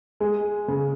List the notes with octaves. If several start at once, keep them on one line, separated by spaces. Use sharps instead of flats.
G#3
C#3